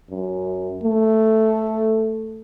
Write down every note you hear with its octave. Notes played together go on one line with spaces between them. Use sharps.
F#2
A3